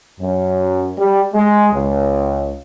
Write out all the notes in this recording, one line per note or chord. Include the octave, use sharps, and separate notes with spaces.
F#2
G3
G#3
C#2